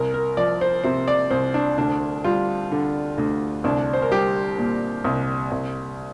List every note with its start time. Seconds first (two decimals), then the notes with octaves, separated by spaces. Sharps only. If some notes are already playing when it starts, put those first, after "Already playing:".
Already playing: C2 A#4
0.14 A#4
0.37 F3 D5
0.61 C5
0.84 C3 C5
1.08 D5
1.30 C2 C5
1.54 D4
1.78 D2 D4
2.24 G3 F4
2.72 D3
3.18 D2
3.64 C2 D4
3.93 C5
4.02 A#4
4.11 G3 G4
4.58 A#2
5.04 C2
5.51 C2